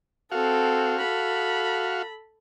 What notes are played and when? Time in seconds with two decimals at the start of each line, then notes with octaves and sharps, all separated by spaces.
0.32 C4 F#4 A4 F5
1.01 A4 B5